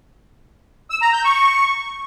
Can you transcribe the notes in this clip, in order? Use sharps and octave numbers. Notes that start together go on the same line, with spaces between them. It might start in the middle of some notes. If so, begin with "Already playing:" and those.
E6
A#5
G6
C#6